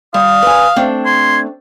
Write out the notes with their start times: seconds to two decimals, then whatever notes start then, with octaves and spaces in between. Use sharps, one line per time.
0.14 G3 F5 D#6
0.43 B4 G#5
0.76 A3 C4 D4
1.05 C6 G#6